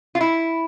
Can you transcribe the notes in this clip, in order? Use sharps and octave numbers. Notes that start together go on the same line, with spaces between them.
F4
E4